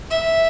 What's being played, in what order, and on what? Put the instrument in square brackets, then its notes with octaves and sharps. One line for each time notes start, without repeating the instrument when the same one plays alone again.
[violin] E5